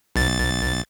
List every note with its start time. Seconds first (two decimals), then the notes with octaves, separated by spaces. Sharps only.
0.16 B1 A6